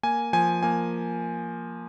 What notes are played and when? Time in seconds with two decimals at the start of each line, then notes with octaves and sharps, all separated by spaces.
0.03 A#3 G#5
0.33 F3 G#5
0.63 A#3 G#5